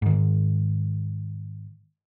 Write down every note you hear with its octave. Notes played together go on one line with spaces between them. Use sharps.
G#2 D#3